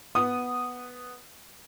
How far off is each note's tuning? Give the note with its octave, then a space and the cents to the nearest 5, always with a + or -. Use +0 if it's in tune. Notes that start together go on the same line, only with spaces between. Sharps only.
B3 +0 F#5 +0 D#6 -10